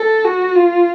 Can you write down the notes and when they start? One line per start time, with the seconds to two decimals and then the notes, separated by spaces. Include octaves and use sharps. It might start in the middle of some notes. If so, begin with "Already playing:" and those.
Already playing: A4
0.25 F#4
0.56 F4